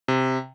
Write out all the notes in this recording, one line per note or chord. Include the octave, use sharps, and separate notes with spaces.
C3